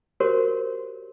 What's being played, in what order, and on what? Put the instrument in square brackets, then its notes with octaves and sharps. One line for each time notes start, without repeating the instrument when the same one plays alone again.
[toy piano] F#4 G4 A#4 C5 C#5